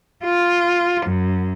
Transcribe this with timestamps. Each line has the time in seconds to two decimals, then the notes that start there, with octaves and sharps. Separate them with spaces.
0.25 F4
1.06 F#2